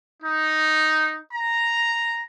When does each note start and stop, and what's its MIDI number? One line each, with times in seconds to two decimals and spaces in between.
0.23 1.19 63
1.34 2.21 82